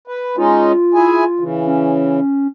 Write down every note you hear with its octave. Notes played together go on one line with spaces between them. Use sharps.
B4
G#3 C#4 D#4 F4
E4 G#4 G#5
C#3 E3
C#4